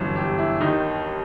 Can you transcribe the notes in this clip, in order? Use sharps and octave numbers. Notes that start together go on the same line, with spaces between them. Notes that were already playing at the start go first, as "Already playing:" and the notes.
Already playing: G1 F#2 E3
G4
E4
D#2 D#3 D#4